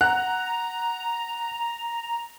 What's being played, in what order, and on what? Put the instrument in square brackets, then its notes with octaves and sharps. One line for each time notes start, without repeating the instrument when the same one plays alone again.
[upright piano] F#5 F#6 [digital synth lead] A#5